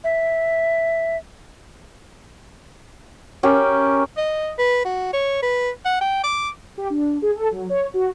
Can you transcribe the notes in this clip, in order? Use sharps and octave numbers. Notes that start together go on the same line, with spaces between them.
E5
C#4 G4 A#4
D#5
B4
F#4
C#5
B4
F#5
G5
D6
G4
D4
G#4
A4
F#3
C#5
F#4